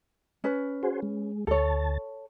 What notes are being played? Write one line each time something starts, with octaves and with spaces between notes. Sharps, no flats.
C#4 B4
F#4 G#4 C5
G#3
D2 A4 C#5 A5